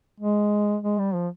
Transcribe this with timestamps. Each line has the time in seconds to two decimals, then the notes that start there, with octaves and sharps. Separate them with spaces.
0.20 G#3
0.83 G#3
0.98 G3
1.14 F3